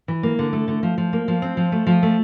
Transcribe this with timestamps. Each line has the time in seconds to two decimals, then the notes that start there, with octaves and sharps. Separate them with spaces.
0.08 E3
0.23 A#3
0.39 D3
0.53 A3
0.68 D3
0.83 F3
0.98 F3
1.13 A#3
1.28 F3
1.42 C4
1.57 F3
1.72 A3
1.87 F3
2.03 A3